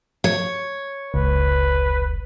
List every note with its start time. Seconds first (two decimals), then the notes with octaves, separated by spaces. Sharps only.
0.24 C#5
1.14 F1 C#2 B4